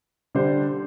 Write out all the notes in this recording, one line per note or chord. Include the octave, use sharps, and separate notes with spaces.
D3 G3 D4 G4 C5